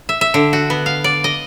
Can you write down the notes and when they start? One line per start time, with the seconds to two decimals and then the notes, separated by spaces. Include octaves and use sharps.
0.09 E5
0.21 E5
0.34 D3
0.53 F#4
0.70 B3
0.86 F5
1.04 D5
1.24 D#5